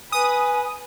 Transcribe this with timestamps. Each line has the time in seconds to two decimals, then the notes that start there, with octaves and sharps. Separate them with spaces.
0.12 B4 G#5 D#6